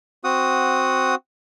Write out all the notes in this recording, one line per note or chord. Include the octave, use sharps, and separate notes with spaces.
C4 F#4 F#5 D#6